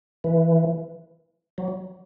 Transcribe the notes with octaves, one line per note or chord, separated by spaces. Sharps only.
E3
F#3